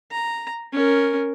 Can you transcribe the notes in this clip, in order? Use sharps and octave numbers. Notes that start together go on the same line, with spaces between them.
A#5
C#4 A#4